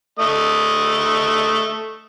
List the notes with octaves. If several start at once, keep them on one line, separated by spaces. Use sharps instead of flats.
A3 D#5